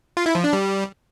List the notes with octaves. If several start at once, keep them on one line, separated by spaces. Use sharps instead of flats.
F4
E4
F3
D4
G3